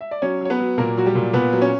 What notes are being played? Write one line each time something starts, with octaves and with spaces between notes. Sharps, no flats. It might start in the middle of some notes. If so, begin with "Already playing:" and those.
E5
D5
F#3 C#4 C#5
F#3 C#5
B3 B4
F#3
A#2 A#3 A#4
F#3 F#4
G3 G4
A#2
A#2 B3 B4
F#3
C#4 C#5